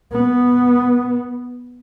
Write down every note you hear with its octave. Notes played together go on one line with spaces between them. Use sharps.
B3